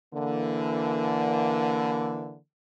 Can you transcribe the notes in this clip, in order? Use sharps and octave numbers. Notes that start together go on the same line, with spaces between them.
D3 E3 A#3